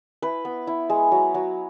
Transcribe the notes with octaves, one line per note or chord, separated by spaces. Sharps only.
E4 B4
B3
E4
G#3
F#3
F#3